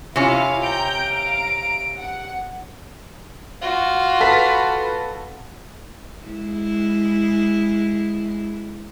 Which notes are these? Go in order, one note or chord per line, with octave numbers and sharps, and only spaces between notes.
C3 C#4 E4 F4 F5
G5 A#5 G6 D7
F5 A#5
F#5
F4 F#4
A4 B4 B6
G#3 E4